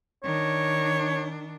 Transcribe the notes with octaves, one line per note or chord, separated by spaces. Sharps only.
D#3 D4 C#5